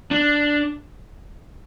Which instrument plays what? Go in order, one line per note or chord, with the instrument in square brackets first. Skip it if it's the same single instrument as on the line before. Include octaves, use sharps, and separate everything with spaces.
[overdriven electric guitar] D4